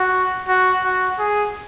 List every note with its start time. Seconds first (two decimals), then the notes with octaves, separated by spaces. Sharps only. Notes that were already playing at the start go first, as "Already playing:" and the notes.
Already playing: F#4
0.48 F#4
0.84 F#4
1.19 G#4